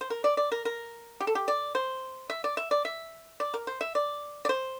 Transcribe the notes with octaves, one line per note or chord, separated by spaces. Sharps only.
C5
A#4
D5
D5
A#4
A#4
G4
A4
G4
D5
C5
E5
D5
E5
D5
E5
D5
A#4
C5
E5
D5
D5
C5